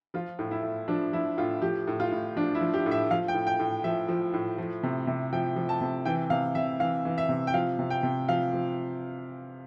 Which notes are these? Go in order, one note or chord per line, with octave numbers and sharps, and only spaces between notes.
F3 F4
A2
E4
A2
F3 D4
F3 E4
A2 F4
F3 G4
A2
F4
A2
F3 D4
E4
F3
G4
A2
E5
F3 F5
G5
A2
G5
A2
F3 E5
F3
A2
F3
C3
C3
F3 G5
F3
A5
C3
E3 G5
C3 F5
C3 E5
E3 F5
E3
E5
C3
G5
F3 F5
C3
G5
C3
F3 F5
F3